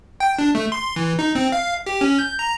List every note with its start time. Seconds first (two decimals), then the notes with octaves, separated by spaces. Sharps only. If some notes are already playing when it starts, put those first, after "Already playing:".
0.20 G5
0.39 D4
0.55 A3
0.72 C6
0.96 E3
1.19 D#4
1.35 C4
1.52 F5
1.86 G4
2.01 C#4
2.19 G6
2.39 A#5